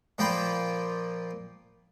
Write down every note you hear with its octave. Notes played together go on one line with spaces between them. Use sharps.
A#2 F3 A#3 C5 G5 B5